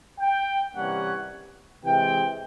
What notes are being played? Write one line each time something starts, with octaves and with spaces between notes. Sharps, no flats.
G5
C3 E3 G3 A#3 C#4 F#5
C3 E3 G#3 G5